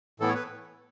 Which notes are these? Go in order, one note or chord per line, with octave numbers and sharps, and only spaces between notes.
A2 E3 B3 E4 A4
C#5
B4